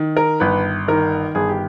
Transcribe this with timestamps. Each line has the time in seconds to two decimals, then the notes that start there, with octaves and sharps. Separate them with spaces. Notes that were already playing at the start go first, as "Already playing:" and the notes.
Already playing: D#3
0.17 A#4
0.40 G1 B4
0.88 D#3 A#4
1.35 G1 G#4
1.49 G4